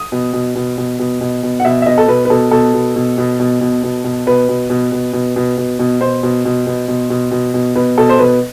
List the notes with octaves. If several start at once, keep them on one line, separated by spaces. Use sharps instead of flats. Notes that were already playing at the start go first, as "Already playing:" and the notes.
Already playing: D#6
B2
B2
B2
B2
B2
B2
B2
F#5
B2 E5
E5
B2 D#5
A4
B2 B4
B4
B2 A4
B2 A4
B2
B2
B2
B2
B2
B2
B2
B2 B4
B2
B2
B2
B2
B2
B2
B2
B2 C5
B2
B2
B2
B2
B2
B2
B2
B2 B4
B2 A4
C5
B2 B4